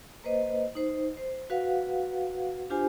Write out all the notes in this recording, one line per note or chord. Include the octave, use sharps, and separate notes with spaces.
A#3 B4 C5 D#5
D#4 C5
C5
F#4 B4 F5 F#5
D4 F4 G4 C5 G#5